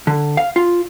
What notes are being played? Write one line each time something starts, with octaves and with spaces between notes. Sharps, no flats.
D3
F5
F4